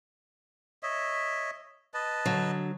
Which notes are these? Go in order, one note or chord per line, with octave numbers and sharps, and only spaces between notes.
C#5 D#5 E5
B4 D#5 A5
D3 F#3